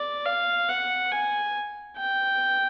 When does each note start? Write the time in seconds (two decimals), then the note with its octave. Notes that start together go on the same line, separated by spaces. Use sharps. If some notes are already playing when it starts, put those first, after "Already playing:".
Already playing: D5
0.25 F5
0.68 F#5
1.11 G#5
1.97 G5